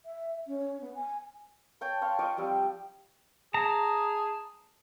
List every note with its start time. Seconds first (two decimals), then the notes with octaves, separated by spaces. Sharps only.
0.05 E5
0.47 C#4
0.81 B3
0.94 G#5
1.81 C#5 G5 A5
2.02 C#5 F5 C6
2.19 F4 D#5 C#6 D6
2.37 F3 G3 C4
3.54 G#4 A5 A#5